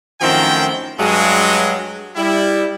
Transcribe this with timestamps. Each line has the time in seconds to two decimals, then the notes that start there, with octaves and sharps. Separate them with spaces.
0.21 F#2 A2 D#3 F3 C4 G5
0.99 G2 F#3 G#3
2.16 G3 E4